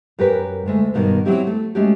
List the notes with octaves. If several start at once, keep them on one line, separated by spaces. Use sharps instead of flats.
F#2 G4 A#4 B4
D2 G#3 A3
G2 B2 D#3
F#3 C4 E4 G4 C#5
A3
G#3 A3 C#4 F#4 G4